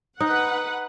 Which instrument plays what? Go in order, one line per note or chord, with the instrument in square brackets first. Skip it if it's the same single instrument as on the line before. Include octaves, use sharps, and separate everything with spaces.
[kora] D#4 [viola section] B4 F#5